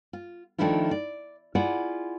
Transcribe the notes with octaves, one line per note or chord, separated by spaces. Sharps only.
F4
D#3 F3 A3 D4 E4 F4
D5
E4 F4 G#4 D5 F5 F#5